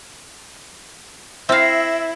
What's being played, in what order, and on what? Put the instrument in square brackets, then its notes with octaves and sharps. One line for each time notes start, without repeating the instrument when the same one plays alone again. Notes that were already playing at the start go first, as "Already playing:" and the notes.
[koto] C4 F5 [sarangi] E4 [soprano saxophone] E5 [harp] E6 A#6 C7